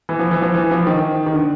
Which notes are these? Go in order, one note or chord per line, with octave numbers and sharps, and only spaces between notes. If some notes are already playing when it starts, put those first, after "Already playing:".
E3
F3
E3
F3
E3
F3
D#3
D#3
D3